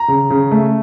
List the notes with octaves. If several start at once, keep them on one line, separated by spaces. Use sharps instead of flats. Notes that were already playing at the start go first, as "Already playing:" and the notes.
Already playing: A#5
C#3
C#3
A3